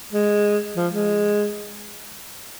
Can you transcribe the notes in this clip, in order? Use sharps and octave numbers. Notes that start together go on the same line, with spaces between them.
G#3
F3
G#3